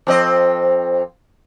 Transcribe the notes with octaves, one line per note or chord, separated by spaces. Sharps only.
F2 C4 D#5